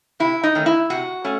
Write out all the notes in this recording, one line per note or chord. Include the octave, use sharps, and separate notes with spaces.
C3 E4
D#4
D#3 A3 C#4
E4
C3 F#4
A3 C#4